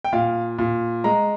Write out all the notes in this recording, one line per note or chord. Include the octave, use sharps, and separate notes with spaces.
G5
A#2 F5
A#2
G#3 A#5